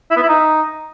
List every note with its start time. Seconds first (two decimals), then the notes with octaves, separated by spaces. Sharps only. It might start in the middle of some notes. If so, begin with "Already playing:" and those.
0.10 E4
0.16 B3
0.23 E4
0.29 D#4